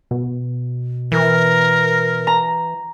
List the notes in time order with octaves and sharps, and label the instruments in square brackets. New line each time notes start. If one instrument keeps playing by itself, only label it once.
[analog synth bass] B2
[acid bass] E3 [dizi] A#4
[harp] A#5